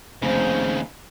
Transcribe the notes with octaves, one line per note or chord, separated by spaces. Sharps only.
F1 D#2 C#3 C5